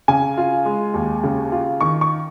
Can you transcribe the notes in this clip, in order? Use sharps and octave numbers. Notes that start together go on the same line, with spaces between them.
C#3 G#5
F4
G#3
D#2
C#3
F4
D#3 C#6
C#6